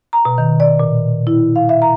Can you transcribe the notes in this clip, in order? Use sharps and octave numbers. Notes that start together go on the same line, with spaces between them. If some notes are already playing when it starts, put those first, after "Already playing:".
A#5
B2
D#3
D5
A#2
E4
F5
E5
A#5